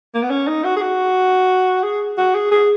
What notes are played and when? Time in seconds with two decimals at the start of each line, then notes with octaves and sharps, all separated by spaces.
0.14 A#3
0.22 B3
0.30 C#4
0.47 D#4
0.64 F#4
0.76 G#4
0.81 F#4
1.83 G#4
2.17 F#4
2.35 G#4
2.51 G#4